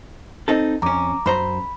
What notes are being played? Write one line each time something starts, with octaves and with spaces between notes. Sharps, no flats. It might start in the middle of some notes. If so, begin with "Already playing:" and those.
C4 D#4 A4
F2 C#4 A#5 D6
F#2 C5 A#5 B5